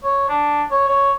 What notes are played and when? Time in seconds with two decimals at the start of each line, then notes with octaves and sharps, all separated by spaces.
0.04 C#5
0.29 D4
0.71 C#5
0.88 C#5